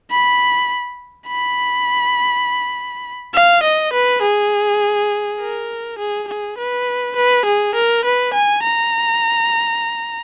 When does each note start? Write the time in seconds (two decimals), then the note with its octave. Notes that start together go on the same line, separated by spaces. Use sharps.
0.11 B5
1.28 B5
3.34 F5
3.63 D#5
3.93 B4
4.22 G#4
5.40 A#4
5.98 G#4
6.28 G#4
6.58 B4
7.16 B4
7.45 G#4
7.75 A#4
8.05 B4
8.34 G#5
8.63 A#5